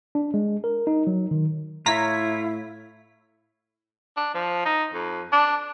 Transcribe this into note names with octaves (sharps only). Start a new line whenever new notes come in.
D4
G#3
A#4
D#4
F#3
D#3
A2 E4 F4 C#5 A#5 A#6 B6
D4
F3
D#4
F2
D4